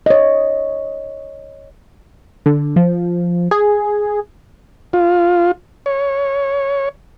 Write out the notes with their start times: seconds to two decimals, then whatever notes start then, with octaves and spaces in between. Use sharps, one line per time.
0.06 C#5 D#5
2.46 D3
2.76 F3
3.51 G#4
4.93 F4
5.86 C#5